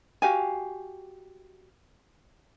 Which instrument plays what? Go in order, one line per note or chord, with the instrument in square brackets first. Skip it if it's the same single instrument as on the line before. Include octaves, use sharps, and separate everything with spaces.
[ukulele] F#4 G4 F5 G#5